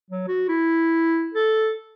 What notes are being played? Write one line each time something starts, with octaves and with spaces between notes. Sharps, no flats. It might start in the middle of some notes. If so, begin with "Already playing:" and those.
F#3
F#4
E4
A4